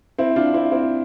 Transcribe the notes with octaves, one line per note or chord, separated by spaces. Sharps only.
C4 E4
D4 F4
C4 E4
C4 E4